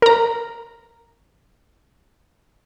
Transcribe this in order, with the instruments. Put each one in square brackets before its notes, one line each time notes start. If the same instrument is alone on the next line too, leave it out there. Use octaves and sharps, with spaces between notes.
[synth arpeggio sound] A#4 A#5